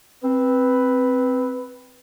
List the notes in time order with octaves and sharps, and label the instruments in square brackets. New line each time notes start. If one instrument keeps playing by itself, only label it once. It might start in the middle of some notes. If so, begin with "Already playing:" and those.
[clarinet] C4 [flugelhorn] B4